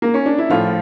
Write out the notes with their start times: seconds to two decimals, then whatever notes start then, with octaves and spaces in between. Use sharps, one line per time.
0.02 A#3
0.14 C#4
0.26 D4
0.38 E4
0.50 A2 F3 F4